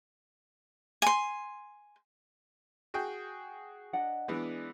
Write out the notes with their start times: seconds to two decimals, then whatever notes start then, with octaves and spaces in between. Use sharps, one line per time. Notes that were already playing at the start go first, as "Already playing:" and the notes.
1.02 G#5 C6
2.94 F#4 G#4 G5
3.93 D4 D#5 F#5
4.28 E3 G#3 B3 D4 G#4